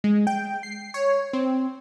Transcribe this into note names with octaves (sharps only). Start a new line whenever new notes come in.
G#3
G5
C7
C#5
C4